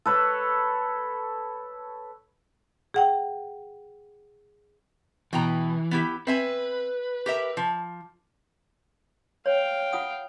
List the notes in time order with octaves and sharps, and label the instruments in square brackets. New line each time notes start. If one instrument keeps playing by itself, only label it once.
[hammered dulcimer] A4 B4 C#5
[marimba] G#4 F#5 G5
[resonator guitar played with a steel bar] B2 G5 A#5 [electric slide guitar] E3
[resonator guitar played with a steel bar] B3 E4 G4
[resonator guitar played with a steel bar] C4 E5 G#5 [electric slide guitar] B4
[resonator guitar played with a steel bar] G4 A#4 E5
F3
[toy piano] C#5 [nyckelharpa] F5 G5
[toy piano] F4 F#5 D#6